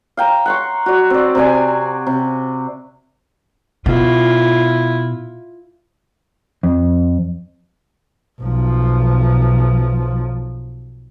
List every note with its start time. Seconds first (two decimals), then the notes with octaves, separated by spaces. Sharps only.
0.17 F5 G5 A#5
0.46 F#5 C6 C#6
0.86 F#4 D5
1.10 C4 D5
1.35 C3 C5 D5 G#5
2.07 C3
3.86 B2 E4 F4
6.63 F2
8.41 B1 F3